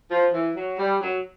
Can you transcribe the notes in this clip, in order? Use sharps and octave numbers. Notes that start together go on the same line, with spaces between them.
F3
E3
F#3
G3
F#3